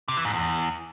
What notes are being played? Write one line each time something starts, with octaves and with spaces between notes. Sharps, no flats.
C3
E3
G#2
E2